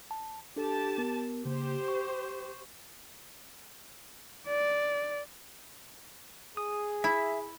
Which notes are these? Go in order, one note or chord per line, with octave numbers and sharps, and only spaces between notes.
A5
D4 G4 A4 A5
B3 A#4
C#3 A#3 G4 C5
C#6
D5
G#4 D#6
E4 E5